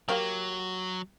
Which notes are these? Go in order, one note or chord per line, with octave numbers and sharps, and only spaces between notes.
F#3 A#3 G4 F5